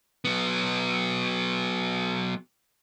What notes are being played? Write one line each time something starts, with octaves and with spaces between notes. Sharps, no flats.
F#3 B3